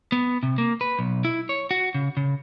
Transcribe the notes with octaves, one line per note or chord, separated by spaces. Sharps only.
B3
C3
A#3
B4
B1
E4
C#5
F#4
C#3
C#3